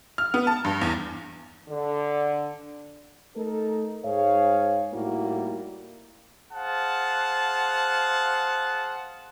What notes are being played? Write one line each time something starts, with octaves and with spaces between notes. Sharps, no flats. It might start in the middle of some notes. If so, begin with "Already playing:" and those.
F6
B3
A5
G2
E2
D3
A3 D#4 A4 A#4
G#2 G#4 C5 C#5 F5
A2 G3 A#3 D#4 E4 F#4
G#4 C5 F5 F#5 A5